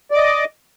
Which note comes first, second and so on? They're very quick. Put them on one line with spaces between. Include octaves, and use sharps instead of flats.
D5 D6 D#5